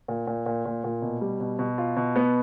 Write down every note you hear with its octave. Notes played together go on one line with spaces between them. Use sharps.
A#2
A#2
A#2
A#2
A#2
B2
G3
B2
B2
F4
B2
B3